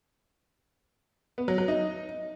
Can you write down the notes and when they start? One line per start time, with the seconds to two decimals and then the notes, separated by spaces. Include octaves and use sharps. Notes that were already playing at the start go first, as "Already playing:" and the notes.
1.38 B3
1.48 F#3
1.58 F#3
1.68 D#4